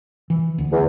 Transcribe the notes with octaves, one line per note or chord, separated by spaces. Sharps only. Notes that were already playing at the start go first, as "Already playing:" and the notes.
E3
D2
E2